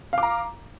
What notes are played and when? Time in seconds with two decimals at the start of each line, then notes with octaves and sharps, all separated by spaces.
0.13 F5
0.18 D6
0.23 A#5